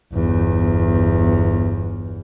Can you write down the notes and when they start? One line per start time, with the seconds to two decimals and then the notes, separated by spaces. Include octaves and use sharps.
0.13 G1 E2